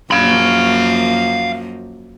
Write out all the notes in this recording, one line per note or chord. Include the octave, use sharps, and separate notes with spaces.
F#2 F3 A#3 F5 B5